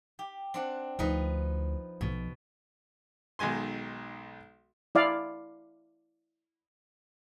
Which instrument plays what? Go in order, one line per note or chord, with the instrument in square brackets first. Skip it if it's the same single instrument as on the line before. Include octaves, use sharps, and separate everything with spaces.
[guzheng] G4
C4 D4 F#5
[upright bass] D2 [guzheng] F3 D#4 B4
[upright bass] B1 F3 [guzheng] B2
[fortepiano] B1 D#3 G#3 G#5 C6
[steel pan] E4 D5 F5